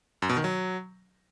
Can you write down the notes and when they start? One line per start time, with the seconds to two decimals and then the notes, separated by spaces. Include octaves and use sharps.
0.22 F#2
0.29 B2
0.37 D#3
0.44 F#3